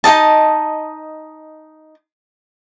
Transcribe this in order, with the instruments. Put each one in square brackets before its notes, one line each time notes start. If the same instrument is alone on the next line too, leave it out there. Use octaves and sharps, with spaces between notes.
[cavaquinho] D#4 G#4 D#5 A5